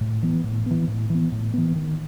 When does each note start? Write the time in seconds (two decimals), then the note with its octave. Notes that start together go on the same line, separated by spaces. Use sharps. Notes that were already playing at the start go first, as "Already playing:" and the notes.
0.01 A2
0.23 E3 B3
0.44 A2
0.66 E3 B3
0.88 A2
1.10 E3 B3
1.32 A2
1.54 E3 B3
1.76 D#3